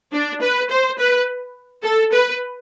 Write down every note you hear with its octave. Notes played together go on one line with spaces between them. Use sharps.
D4
B4
C5
B4
A4
B4